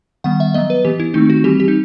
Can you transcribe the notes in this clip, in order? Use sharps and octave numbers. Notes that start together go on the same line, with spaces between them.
D#3 G3 B3 F#5
E5
F#3 B3 D#5
B4
E3 B3 G4
E4
D#3 A3 C4 D#4
F#4
E3 G3 C4 G4
G4
D#4